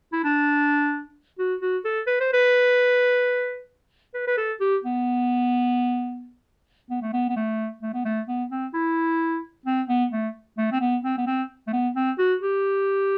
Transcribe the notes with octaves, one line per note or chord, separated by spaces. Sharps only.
E4
D4
F#4
F#4
A4
B4
C5
B4
B4
B4
A4
G4
B3
B3
A3
B3
B3
A3
A3
B3
A3
B3
C4
E4
C4
B3
A3
A3
C4
B3
C4
B3
C4
A3
B3
C4
F#4
G4